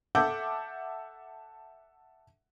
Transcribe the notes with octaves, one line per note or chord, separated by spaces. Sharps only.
A4 E5 F#5 A5 D6 G6